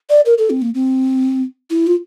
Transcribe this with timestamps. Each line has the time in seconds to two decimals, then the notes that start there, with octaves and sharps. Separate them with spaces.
0.10 D5
0.26 A#4
0.38 A4
0.50 C4
0.62 A#3
0.75 C4
1.70 E4
1.87 F4